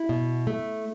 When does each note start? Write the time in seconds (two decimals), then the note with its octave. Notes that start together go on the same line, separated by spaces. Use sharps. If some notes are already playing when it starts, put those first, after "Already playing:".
Already playing: E4
0.09 B2
0.47 A3